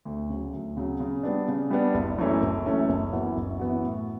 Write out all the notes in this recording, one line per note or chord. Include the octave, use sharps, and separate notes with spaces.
D2
C#3 F#3
D2
C#3 F#3
C#3
G3 B3 D4
C#3
G3 B3 D4
F#1
F#2 E3 A3 C#4
F#1
F#2 E3 A3 C#4
F#1
F#2 E3 B3 F#4
F#1
F#2 E3 B3 F#4
A2